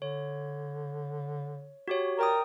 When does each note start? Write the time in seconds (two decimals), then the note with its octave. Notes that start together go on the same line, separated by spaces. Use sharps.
0.02 D3 C#5
1.88 F#4 G4 C#5
2.19 A#4 D5 G5 D#6